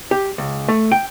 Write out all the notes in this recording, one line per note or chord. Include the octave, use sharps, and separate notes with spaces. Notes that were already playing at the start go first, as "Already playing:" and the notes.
G4
C#2
A3
G5